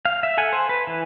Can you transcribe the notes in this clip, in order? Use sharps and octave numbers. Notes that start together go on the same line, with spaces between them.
F5
E5
A4 F#5 G#5
C5
B4
E3